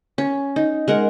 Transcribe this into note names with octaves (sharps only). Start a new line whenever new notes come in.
C#4
D#4
G#3 A#4 F#5